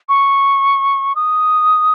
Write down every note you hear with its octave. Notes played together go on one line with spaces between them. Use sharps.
C#6
D#6